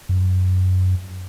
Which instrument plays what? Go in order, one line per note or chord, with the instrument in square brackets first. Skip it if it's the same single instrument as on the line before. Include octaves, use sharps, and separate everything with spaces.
[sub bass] F#2